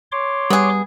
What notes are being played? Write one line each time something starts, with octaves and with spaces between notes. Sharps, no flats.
C#5 C6 D6
G3 B3 G#4